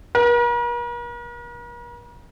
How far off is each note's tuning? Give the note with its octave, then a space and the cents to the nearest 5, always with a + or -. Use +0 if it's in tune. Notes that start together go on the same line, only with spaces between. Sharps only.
A#4 +45